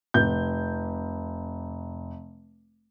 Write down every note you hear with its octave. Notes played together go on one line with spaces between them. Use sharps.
F1 G6